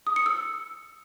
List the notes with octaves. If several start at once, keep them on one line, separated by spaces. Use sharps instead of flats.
D#6
C#7
E6